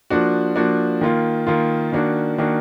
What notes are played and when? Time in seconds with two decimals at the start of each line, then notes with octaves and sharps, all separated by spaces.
0.10 F3 A#3 D4 F#4
0.56 F3 A#3 D4 F#4
1.01 D#3 A#3 F4
1.47 D#3 A#3 F4
1.92 D#3 A#3 D4 F#4
2.38 D#3 A#3 D4 F#4